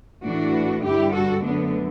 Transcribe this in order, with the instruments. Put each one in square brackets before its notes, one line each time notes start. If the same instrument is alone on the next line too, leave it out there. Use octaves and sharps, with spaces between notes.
[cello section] A2 E3 A3 D4 F#4
G2 D3 G3 E4 G4
F#4 A4
F#2 D3 A3 B3 D4